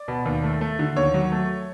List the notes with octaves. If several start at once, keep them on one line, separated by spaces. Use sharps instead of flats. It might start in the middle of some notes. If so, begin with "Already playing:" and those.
Already playing: D5
B2
D#2
A3
A3
D3
D#2 C#5
F#3
A3